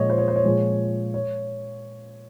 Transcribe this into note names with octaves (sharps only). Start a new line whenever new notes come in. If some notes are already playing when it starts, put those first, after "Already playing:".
Already playing: A#2 F3 G#3 C#5 D#5
C5
C#5
C5
C#5
A#2 F3 G#3
C#5